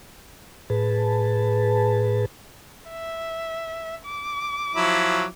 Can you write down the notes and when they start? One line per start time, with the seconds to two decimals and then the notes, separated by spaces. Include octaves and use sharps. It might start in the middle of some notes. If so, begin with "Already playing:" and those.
0.70 A2 G#4 B4 A5
2.90 E5
4.05 D6
4.75 F3 F#3 E4